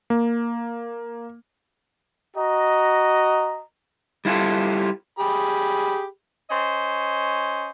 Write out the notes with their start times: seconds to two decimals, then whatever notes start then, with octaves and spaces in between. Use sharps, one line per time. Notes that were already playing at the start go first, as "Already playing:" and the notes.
0.10 A#3
2.35 F#4 D#5 A#5
4.25 G3 E4 F4 G4 A4
5.19 G4 G#4 B5
6.49 C#4 C5 D#5